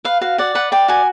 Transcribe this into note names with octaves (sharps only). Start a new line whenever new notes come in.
B4 F5
F#4 F5
D5 F#5
B4 F#5
D5 G5
F#4 G#5